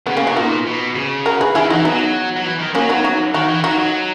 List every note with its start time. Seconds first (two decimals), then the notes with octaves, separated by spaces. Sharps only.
0.06 C#3 B3
0.17 A#3 C#4
0.26 B2 B3 D#4
0.37 A#2 B3 D#4
0.67 B2
0.96 C#3
1.26 F#4 A#4
1.41 G#4 B4
1.55 D#3 E4 G#4
1.70 E3 D#4 F#4
1.85 F#3 B3 D#4
2.37 F#3
2.45 E3
2.60 D#3
2.75 F#3 A#3 C#4
2.89 B3 D#4
3.04 D#4 F#4
3.34 D#3 D#4 F#4
3.49 E3
3.63 F#3 D#4 F#4
3.78 F#3